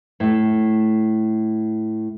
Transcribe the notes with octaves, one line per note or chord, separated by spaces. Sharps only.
A2 A3